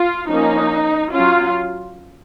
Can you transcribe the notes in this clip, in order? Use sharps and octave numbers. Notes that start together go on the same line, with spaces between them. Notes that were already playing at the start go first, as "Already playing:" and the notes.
Already playing: F4
F3 A#3 C#4 D#4
F#3 C#4 F4